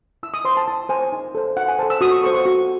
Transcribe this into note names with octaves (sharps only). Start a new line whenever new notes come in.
E4 E6
D#6
C5 C6
A5
E4 A5
C5 G#5
D#4
A4 C5
D#4 F#5
G#5
A4 C5 A5
E6
F#4 D#6
C#6
A4 C5 C#6
C#6
F#4